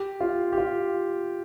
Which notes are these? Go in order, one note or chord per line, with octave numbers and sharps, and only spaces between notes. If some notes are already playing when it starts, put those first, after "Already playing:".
Already playing: G4
F4
G4
F4